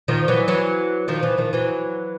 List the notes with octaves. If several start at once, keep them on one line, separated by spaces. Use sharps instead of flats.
D#3 F3
E3 F#3
E3 F#3
D#3 F3
E3
D#3 F3
E3 F#3